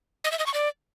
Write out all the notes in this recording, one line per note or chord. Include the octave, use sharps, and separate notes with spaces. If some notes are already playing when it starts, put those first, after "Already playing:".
D#5
E5
D#5
C#6
D5